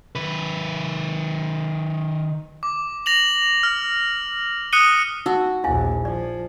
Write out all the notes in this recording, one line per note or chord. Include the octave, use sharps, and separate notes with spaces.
D#3 B4
D6
A#6 F7 F#7
F6
D#6 F#6 C#7 D#7 G7
D#4 F#4 E6
A#1 D#2 E4 F5 G#5
F3 D5